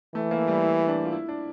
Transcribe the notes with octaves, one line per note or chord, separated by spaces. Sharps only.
E3 A3
A#3
G3
E4
D4
F4
E4
D4